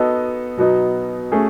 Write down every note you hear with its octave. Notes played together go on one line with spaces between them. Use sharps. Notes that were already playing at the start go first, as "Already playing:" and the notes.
Already playing: B3 D#4 F#4 A4 D#5
B2 F#3 B3 D#4
A3 C#4 G#4